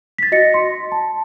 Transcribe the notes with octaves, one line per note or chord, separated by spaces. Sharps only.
A6 B6
F#4 D#5 A#6 C#7
C6
A5